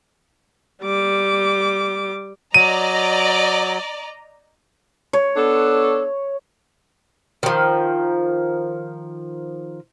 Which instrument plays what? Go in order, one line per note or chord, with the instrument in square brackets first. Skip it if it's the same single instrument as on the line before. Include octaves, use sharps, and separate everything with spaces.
[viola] G3 D6
[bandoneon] F#3 [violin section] D5 D#5 A#5 [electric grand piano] D#7
[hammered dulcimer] C#5
[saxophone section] B3 D4 A4
[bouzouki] D#3 F3